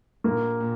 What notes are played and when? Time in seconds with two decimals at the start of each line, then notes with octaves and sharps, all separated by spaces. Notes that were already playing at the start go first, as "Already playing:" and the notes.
0.24 A#1 A#3
0.60 A#2